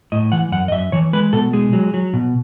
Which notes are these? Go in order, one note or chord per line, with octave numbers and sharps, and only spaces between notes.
A2 D#5
E3 F#5
F#2 F#5
D#5
F#2 E5
E3 C#5
G#3 B4
B2 A4
G#3 G#4
F#3
F#3
B2